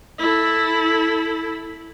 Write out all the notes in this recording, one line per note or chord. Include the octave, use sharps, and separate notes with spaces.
E4 A4